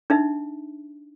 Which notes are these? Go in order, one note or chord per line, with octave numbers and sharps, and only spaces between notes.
D4 D#4 E5